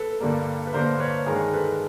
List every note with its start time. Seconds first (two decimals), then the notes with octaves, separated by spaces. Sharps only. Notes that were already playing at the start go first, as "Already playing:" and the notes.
Already playing: A4 B4
0.20 G2 D3 G3 A#3
0.67 B4
0.73 G2 D3 G3 A#3 A#4 C5
1.00 B4 C#5
1.26 G2 D#3 G#3 G#4 A#4
1.53 A4 B4